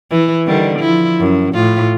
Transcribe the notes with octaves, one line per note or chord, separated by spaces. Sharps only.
E3 E4
D3 D#3 G3
F3 E4
F#2
A2 F4